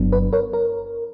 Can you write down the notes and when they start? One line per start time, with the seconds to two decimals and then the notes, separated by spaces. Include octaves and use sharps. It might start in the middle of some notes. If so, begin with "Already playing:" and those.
Already playing: G1 G2 F#3 B3 D4
0.12 B4
0.33 A#4 C#5
0.53 A#4